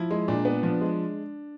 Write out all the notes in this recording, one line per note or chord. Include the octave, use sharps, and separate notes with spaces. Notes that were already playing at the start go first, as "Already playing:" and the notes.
Already playing: F3 E4
G#3
A#2 D4
B3
F3 D4
G#3